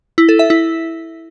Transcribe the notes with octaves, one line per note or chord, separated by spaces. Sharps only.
E4
A4
E5
E4